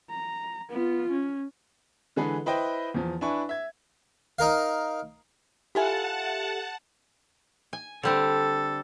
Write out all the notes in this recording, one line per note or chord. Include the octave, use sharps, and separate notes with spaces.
A#5
B3 F4
C#4
D3 E3 G#3 G#4 A4 B4
E4 B4 C5 D#5 G5
E2 F3
D4 E4 B4 G#5 C#6
E5 G#6
D#4 A#4 F5
E4 F4 G4 A4 E5 F#5 G#5 A5
G#5
D3 G3 C4 A4